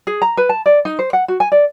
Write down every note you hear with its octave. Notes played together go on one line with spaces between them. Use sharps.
G#4
A#5
B4
A5
D5
D#4
C5
F#5
F#4
G#5
D5